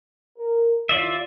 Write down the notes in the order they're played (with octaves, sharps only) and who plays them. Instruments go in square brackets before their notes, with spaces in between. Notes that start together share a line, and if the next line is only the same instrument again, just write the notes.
[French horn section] A#4
[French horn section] D#2 E4 C#5 [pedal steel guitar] F4 D5 E5